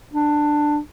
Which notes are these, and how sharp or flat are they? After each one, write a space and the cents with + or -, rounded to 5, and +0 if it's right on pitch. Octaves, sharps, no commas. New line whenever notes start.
D4 +15